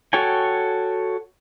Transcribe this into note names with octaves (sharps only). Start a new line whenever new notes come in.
F#4 A4 C#5 G5 G#5